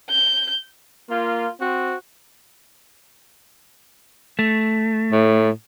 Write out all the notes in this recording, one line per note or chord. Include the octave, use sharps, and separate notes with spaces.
G6
A#3 F4
C4 F#4
A3
A2